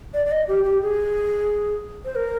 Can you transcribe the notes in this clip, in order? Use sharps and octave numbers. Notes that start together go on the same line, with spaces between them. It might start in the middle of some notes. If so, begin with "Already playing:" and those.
D5
D5
D#5
G4
G4
G#4
C5
A#4